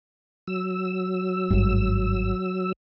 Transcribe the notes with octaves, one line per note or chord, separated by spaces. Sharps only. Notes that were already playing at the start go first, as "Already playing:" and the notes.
F#3 E6
G#1 G2